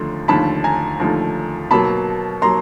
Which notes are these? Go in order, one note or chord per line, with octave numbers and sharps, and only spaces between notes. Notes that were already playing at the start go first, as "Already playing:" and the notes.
Already playing: D#2 D3 F3 A3 C6
D#2 D3 F3 A3 A5 B5
G#5 A#5
D#2 D3 F3 A3
B2 F#3 A#3 A5 B5
F#3 A#3 A#5 C6